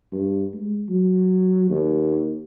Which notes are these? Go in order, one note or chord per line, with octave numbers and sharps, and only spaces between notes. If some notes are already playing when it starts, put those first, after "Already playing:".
G2
G#3
F#3
D#2